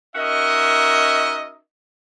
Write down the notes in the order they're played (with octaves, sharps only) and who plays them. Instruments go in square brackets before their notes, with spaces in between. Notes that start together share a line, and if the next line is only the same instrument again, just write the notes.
[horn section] C#4 D#4 F#4 A#4 D#5 E5